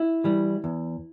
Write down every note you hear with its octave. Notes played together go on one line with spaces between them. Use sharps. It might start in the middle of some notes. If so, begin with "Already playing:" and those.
Already playing: E4
E3 G3
E2